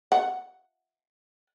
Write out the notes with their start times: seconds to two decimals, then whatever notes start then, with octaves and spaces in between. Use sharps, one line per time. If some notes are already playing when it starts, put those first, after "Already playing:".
0.12 F#5